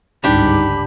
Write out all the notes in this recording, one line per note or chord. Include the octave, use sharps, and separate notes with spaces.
G1 C#2 G#2 D4 D#4 G4 B5